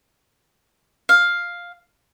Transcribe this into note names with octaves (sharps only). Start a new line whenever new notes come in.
F5